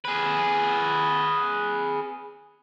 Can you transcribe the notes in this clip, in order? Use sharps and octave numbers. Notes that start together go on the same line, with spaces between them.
G#4 B4